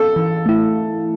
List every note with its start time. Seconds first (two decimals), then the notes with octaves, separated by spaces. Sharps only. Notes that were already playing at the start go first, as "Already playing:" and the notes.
Already playing: A4
0.16 E3
0.46 A3 E4